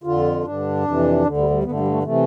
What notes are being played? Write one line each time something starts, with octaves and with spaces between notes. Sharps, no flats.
F2 D3 F4
G2 D3 D4
F2 C3 E3
D2 D3
G3
G3
G2 D3 B3
A3
G3
A3
C3 E3 A3